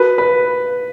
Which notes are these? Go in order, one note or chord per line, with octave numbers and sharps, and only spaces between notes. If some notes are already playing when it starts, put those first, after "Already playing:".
Already playing: F#4 A#4 B4 A5
B4